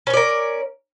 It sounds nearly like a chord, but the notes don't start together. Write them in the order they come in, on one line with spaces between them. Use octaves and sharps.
C#4 C#5 D5 A#4